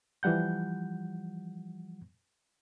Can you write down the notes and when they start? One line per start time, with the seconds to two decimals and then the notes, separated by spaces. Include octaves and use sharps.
0.23 E3 F3 G3 F#5 G6